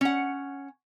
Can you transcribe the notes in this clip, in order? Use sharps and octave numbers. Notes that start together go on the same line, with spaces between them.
C#4 F#5